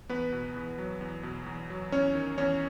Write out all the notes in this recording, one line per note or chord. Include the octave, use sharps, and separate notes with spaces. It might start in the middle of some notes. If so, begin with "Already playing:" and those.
E2 B3 B4
B2
E2
F#3
E2
B2
E2
F#3
E2 C#4 C#5
D#3
E2 C#4 C#5